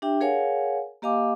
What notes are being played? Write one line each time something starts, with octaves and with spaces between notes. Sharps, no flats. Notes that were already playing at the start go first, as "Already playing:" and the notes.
D4 G4 E5 G5
G#4 A#4 C#5 F5 F#5 G#5
A#3 G4 D#5 F5 G#5 D6